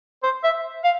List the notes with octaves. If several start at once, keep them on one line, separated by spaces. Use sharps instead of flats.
C5
E5
F5